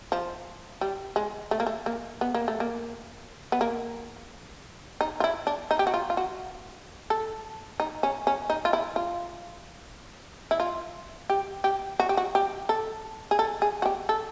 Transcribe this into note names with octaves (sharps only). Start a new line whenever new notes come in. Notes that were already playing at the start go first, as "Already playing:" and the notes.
F3
G3
G#3
A3
A#3
A3
A#3
B3
A#3
A3
A#3
B3
A#3
D#4
F4
E4
D4
D#4
G4
F#4
F4
F4
F#4
A4
D#4
C#4
C#4
D#4
F4
E4
F4
E4
F4
G4
G4
F#4
G4
F#4
G4
A4
G#4
A4
G#4
F#4
G4
A4